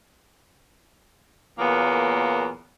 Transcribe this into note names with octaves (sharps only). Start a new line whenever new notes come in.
E2 A#2 F#3 A#3 B3